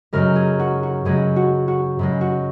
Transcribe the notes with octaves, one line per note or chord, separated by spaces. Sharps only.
F#2 C#3 G#3 A#4
G#4
F#4
F#4
F#2 C#3 G#3 G#4
F#4
F#4
F#2 C#3 G#3
F#4